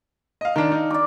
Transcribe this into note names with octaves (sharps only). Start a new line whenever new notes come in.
D#5 F5
D#3 D4 A#4
D#4
D5 D6